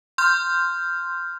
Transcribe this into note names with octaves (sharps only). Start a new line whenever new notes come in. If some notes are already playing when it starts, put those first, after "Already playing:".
C6 F6 G6